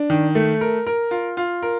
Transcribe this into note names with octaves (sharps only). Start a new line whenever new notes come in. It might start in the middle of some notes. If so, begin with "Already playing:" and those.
Already playing: D4
D#3
A3
A#4
A#4
F4
F4
A#4